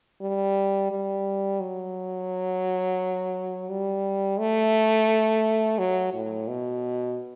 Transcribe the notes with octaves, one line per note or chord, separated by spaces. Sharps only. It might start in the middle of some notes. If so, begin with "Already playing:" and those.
G3
G3
F#3
G3
A3
F#3
A2
B2